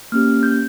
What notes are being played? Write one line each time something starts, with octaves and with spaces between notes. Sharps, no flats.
A#3 C#4 G4 F6
G6